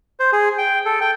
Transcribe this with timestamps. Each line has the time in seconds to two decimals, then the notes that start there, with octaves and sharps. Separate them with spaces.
0.20 C5
0.33 G#4
0.58 G5
0.86 A4
1.01 G5